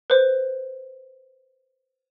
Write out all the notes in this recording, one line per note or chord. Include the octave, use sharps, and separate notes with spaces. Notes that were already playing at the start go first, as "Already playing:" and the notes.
B4 C5